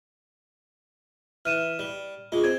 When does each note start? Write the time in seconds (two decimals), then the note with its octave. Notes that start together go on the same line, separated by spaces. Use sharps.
1.45 E3 F6 D#7 E7
1.79 G3
2.32 G#3 F4 G#4
2.44 C4 G#6